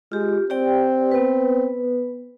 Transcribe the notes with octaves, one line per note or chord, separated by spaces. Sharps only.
G#3 F4 G4
C4 G4 D5 G5
B3 B4